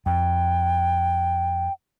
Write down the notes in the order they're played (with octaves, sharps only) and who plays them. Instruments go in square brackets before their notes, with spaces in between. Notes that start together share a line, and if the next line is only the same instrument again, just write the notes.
[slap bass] F2 [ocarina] G5